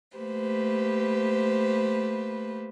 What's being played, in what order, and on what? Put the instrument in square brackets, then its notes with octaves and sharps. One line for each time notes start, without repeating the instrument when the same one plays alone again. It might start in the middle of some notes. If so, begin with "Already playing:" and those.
[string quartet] A3 A#3 G4 B4 C5